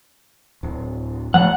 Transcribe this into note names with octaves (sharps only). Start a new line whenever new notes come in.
D1
F3 A3 F#5